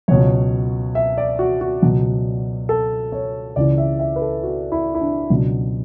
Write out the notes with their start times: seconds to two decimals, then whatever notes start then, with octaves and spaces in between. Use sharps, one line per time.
0.08 C#2 B2 F#3 C#5
0.95 E5
1.18 D5
1.39 F#4
1.61 F#4
1.82 C#2 B2 F#3
2.69 A4
3.12 C#5
3.56 C#2 C#3 E3 D5
3.78 E5
3.99 E5
4.16 B4
4.22 A4
4.43 F#4
4.72 E4
4.95 E4
5.01 D4
5.29 C#2 B2 F#3 D4